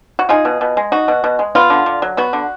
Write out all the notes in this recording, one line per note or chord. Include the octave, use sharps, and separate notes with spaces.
F#4
D#4 F4 G#4
B2
B2
G#3
D#4 F#4
B2
B2
G#3
B3 F4
D3
D3
F#3
B3 F#4
D3